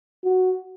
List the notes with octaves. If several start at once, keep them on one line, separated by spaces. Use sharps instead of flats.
F#4